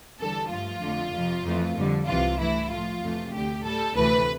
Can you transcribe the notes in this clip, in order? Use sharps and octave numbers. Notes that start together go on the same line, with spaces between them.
E2 D3 G3 A4
G2 F3 A3 F4
F2 D3 A3
F2 C3 F3
F2 E3 A3
F2 D3 G3
C2 C3 E3 G3 F4
G2 E3 A3 E4
A2 F3 A3 F4
F2 C3 E3 A3
D2 D3 A3 G4
A2 G3 A4
D2 C3 E3 A3 B4